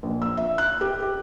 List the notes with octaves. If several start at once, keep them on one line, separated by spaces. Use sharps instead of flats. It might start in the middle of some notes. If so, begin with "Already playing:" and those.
A#1
E6
E5
F#6
G4
G4